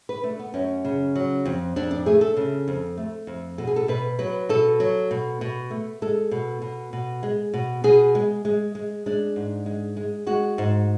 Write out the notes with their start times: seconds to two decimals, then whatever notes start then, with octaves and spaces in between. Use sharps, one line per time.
0.09 B4
0.23 A3 D4
0.39 B3
0.54 F#2 C#4
0.85 C#3
1.16 F#3
1.45 F2
1.76 F2 D4
1.91 D4
2.06 A3 G#4
2.21 A4
2.37 C#3
2.68 F2
2.97 A3
3.27 F2
3.58 B2 A4
3.67 G#4
3.76 A4
3.88 B2 B4
4.19 F#3 B4
4.49 B2 A4
4.80 F#3
5.11 B2
5.41 B2
5.70 A3
6.02 G#3 A4
6.31 B2
6.62 B2
6.93 B2
7.23 G#3
7.54 B2
7.84 B2 G#4
8.15 G#3
8.45 G#3
8.75 G#3
9.06 G#3 D4
9.36 G#2
9.66 G#3
9.97 G#3
10.27 G#3 F#4
10.58 G#2